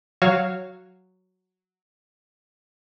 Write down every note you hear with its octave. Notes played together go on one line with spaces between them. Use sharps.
F#3 F#4 C#5 F5 E7